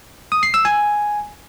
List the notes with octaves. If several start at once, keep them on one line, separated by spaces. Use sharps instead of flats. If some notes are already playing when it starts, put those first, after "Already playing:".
D#6
C7
E6
G#5